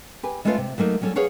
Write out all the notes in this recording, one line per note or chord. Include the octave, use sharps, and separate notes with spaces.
G4 B4 G#5
G#3 A3 C#4 F4 B4 F5
C3
F#3 A3 A#3 D#4
F#3 G3 C#4 G#4 A4
G#4 B4 C#5 F5 F#5